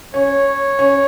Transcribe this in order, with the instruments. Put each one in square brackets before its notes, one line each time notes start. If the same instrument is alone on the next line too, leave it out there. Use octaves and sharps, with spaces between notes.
[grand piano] C#4 [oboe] C#5
[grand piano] C#4